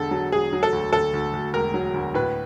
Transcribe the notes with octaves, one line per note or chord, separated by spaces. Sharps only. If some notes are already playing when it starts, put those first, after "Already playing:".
Already playing: E1 D3 A4
F#3
E1 G#4
F#3
A4
D2
D2 A4
D2
D2
E1 A#4
F#3
D2
A2 B4